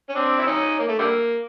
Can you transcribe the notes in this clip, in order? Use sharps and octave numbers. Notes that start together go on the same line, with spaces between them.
C#4
C4 D4
E4
C#4 D#4
A#3
A3
D3 G3 A#3